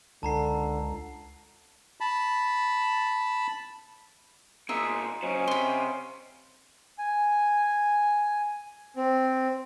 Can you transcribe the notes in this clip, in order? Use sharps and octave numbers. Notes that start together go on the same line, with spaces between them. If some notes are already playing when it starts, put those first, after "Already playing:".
C#2 D3 A5 A#5 C7
A5 B5
B2 A#3 D#4 F4 G#4 E5
C#3 F#3 C#4 C5 D#5 F5
C3 B5 C6
G#5
C4